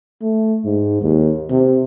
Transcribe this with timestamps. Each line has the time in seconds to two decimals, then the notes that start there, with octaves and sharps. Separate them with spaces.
0.22 A3
0.64 G#2
1.02 D#2
1.50 C3